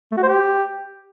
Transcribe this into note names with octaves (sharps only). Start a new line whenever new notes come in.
A3
F#4
C5
G4